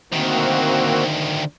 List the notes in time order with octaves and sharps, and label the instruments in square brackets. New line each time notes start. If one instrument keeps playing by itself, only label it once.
[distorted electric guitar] D2 D#3 [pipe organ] A#3 C4 F#4